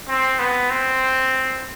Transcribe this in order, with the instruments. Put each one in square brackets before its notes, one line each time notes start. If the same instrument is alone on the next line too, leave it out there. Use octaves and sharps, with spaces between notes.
[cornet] C4
B3
C4